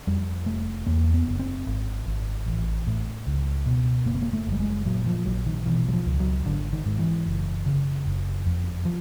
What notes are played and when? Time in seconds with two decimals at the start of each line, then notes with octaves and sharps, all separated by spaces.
0.07 F2 G3
0.46 F1 A3
0.86 E2 A#3
1.14 B3
1.27 F#1
1.39 C4
1.67 G#1
2.06 G#1
2.46 A1
2.87 A2
3.27 C#2
3.66 B2
4.06 F#1 A#3
4.15 B3
4.22 A#3
4.33 A3
4.46 F#1
4.52 G3
4.60 G#3
4.86 A#2 F#3
5.06 F3
5.26 A#1 F#3
5.46 D#3
5.66 B2 E3
5.88 F#3
5.93 F3
6.06 C#2
6.20 F#3
6.45 G#1 D3
6.73 D#3
6.86 G#2
6.99 E3
7.26 F#1
7.66 C#3
8.06 F#1
8.46 F2
8.85 F3